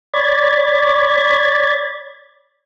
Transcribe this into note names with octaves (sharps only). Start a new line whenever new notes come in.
C#5 D5 B5 G#6 A6